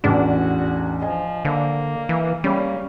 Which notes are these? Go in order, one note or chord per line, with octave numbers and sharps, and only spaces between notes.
A1 E2 D4 F#4
F3 D#5 G#5
D3 A#3
E3
G3 A#3 C#4 B5